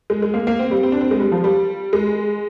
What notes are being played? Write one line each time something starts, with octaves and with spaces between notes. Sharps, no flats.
G#3
G#3
A#3
A#3
C4
G3
C4
D4
C4
G#3
G3
F3
G3
G#3